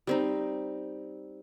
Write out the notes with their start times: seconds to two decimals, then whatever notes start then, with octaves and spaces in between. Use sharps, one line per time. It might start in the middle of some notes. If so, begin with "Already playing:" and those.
0.07 G3 C4 D#4